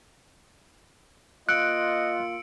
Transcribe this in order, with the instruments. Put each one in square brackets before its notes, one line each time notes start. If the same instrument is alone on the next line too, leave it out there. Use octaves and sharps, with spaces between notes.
[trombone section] A#3 F4 [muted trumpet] D#5 [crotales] E6 C#7 D7 [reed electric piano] F#6